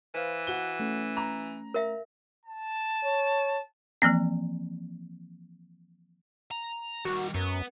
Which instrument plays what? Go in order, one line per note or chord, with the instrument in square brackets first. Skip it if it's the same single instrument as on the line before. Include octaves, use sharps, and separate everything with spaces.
[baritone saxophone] E3 [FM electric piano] B4 C5 F5
[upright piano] F#4 G7
[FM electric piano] A3 C#4
[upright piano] A#5
[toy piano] A#4 E5 F5
[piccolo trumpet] A5
[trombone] C#5
[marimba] E3 F3 A#3 C4
[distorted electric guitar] A#5
[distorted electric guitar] D#3 G3 [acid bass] F#4
[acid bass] F#2 [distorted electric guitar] B3